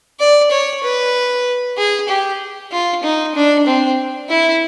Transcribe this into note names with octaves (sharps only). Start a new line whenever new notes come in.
D5
C#5
B4
G#4
G4
F4
D#4
D4
C4
E4